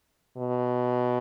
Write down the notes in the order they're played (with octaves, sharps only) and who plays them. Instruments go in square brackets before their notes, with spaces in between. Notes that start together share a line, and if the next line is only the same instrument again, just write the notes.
[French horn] B2